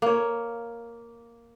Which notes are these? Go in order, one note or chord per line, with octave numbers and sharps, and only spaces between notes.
A#3 C#5